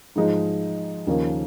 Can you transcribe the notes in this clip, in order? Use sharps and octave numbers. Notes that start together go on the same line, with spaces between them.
G#2 F3 G#3 D#4
D#2 C#3 F3 A#3 C#4